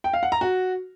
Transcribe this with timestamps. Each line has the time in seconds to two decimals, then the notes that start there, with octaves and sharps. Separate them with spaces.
0.04 G5
0.13 F5
0.23 F#5
0.32 A#5
0.41 F#4